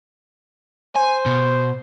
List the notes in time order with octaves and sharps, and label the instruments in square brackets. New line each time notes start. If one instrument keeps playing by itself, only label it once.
[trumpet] C5 [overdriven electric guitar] G#5
[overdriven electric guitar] B2